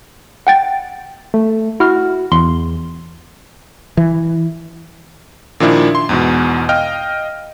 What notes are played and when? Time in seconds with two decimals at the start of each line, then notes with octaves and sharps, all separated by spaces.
0.47 F#5 G5 A6
1.34 A3
1.80 E4 F#4 F6
2.32 E2 C6
3.97 E3
5.60 A#2 D#3 F3 D4 E4
5.95 C6
6.09 E2 G#2 B2
6.69 D#5 F5 G5 F6